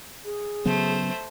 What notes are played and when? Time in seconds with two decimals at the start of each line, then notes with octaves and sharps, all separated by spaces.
0.24 G#4
0.65 C#3 F#3 A3 B3 C5